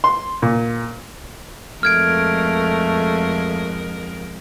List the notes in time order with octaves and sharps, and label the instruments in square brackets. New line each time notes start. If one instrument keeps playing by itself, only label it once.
[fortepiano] C6
A#2
[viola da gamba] F2 G#3 A#4 [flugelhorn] A3 [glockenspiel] F6 G#6 D7